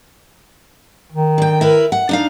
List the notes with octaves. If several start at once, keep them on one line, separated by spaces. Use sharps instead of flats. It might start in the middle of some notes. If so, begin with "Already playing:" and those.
D#3
D3 G5
E4 A#4 B4
F#5
D4 D#4 F5